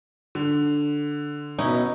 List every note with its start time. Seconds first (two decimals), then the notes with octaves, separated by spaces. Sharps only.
0.35 D3
1.58 B2 C#4 D#4 E4